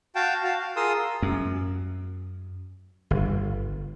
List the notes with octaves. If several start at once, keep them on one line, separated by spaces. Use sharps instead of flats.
F#4 F5 G5 A5
F#4 F5 A5
F5
F4 G#4 A#4 C6 D#6 E6
F#2
G1